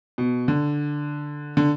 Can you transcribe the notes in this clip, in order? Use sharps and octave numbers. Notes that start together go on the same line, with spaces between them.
B2
D3
D3